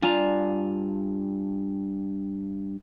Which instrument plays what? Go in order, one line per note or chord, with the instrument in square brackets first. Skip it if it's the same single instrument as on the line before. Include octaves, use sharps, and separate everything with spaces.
[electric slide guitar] G2 G#5 A#5 [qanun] D4 F4